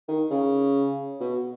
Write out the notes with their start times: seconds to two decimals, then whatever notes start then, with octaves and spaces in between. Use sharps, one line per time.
0.08 D#3
0.31 C#3
1.20 B2